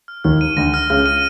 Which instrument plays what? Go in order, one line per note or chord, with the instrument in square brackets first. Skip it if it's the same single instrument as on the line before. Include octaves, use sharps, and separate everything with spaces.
[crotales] F6
[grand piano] D#2 D#3 [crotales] F6
[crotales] D#7
[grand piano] D2 D3 [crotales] A#6
[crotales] F6
[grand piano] C#2 C#3 [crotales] F6
[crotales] D#7